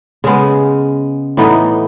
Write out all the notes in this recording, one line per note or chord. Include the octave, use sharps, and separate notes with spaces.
C#3 G#3 B3
A2 E3 B3 D#4